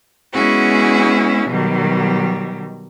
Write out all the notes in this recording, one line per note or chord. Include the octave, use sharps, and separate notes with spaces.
G#3 B3 C#4 E4 F#4 G#4
B2 D#3 F#3 G3